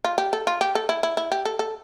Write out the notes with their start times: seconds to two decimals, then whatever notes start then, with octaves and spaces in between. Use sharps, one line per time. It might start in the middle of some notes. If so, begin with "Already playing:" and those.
0.04 F4
0.18 G4
0.33 A4
0.47 F4
0.61 G4
0.75 A4
0.89 E4
1.03 E4
1.17 E4
1.32 G4
1.45 A4
1.59 A4